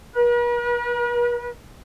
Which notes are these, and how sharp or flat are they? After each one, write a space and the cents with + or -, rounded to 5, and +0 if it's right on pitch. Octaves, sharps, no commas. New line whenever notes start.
B4 -45